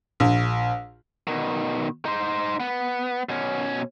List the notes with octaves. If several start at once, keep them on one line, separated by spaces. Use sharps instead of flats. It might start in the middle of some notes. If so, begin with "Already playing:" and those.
A#1
B2 D#3
D#4 C5
B3
B2 C#4